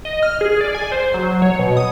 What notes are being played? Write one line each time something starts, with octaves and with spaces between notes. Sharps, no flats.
D#5
F6
G#4
D5
G#5
C5
F#3
C#5
B2
D#6